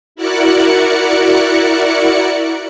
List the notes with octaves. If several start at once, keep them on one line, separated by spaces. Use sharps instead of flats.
E4 F#4 A#4 D5 F#6 C#7